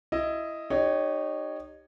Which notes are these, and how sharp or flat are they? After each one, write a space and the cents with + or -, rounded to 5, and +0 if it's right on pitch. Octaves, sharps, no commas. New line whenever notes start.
E4 +15 D#5 +0
D#4 -25 G4 +0 C#5 +0